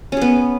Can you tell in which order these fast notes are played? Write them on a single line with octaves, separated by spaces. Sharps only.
C#4 G#4 B3